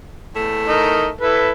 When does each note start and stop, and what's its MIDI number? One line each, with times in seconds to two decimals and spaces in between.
0.35 1.12 40
0.35 1.12 45
0.35 1.12 57
0.68 1.08 63
0.68 1.08 70
0.68 1.08 75
1.21 1.51 64
1.21 1.51 69
1.21 1.51 71